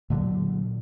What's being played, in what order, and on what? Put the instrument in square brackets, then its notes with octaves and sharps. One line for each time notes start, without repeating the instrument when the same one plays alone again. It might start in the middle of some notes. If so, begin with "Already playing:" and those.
[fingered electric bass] A#2 D3 E3 F#3